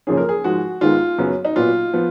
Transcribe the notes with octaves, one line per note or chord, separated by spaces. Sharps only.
F#2 C#3 F3 A#3 C#4 G#4
A#4
G#4
G#2 F3 G#3 F#4
G#2 D#3 G#3 B3 F4
F#2 C#3 F#3 B3
D#4
A#2 F#3 B3 F4
F3 B3